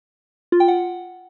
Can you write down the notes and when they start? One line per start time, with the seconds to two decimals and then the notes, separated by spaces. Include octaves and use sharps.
0.52 F4
0.60 G5
0.68 F#5